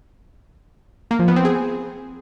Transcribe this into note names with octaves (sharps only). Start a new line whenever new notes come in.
A#3
F3
B3
C4
G#4